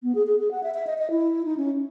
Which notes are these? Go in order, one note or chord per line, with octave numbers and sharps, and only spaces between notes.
B3
G#4
G#4
G#4
F#5
E5
E5
D#5
D#5
E4
D#4
C#4